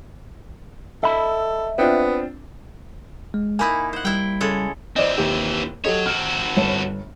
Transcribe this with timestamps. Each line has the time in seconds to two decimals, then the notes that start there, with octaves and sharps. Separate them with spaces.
1.03 A4 D#5 E5 B5
1.78 B3 C4 D4 F4
3.34 G#3
3.59 A#3 D#4 E4 G#5 B5
3.93 C5 F#5
4.05 G3 E4 G5
4.41 C#3 G#3 A4
4.96 E3 C4 C5 D5 D#5
5.18 D#2 G4
5.85 F#3 G4 A4 C#5 D#5
6.06 C4 F#4 F6
6.57 G1 C#5 A5